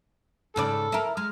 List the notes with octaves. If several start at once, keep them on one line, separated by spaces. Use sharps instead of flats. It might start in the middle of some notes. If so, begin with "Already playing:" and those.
G#2 C#3 A4 D5
E4 A#4
G#3 F6